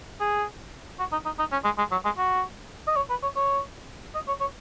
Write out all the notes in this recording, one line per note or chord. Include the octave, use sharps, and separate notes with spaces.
G#4
F#4
D#4
D#4
D#4
C#4
G#3
G#3
F#3
G#3
F#4
D#5
C#5
B4
C#5
C#5
D#5
C#5
C#5